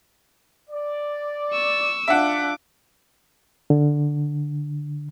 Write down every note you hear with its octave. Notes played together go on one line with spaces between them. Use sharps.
D5
C#6 E6
D4 F4 E5 F#5 D6
D3